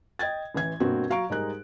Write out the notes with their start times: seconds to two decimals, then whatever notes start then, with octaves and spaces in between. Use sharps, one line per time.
0.19 D#5 G5 G#6 A6
0.55 A1 E3 G#6
0.80 G2 B2 A#3 C4 F#4
1.10 F#3 F5 A#5 C#6 D7
1.30 G#2 G3 G#3 D#4 A#4 F#6